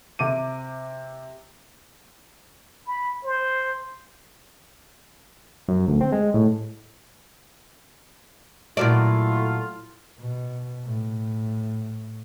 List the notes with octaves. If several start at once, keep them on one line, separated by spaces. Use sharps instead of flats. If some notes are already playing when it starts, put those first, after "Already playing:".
C3 D6 D#7
B5
C5
F#2
D2
C4
G#3
A2
A#2 F#3 A3 E4 F4 D5
B2
A2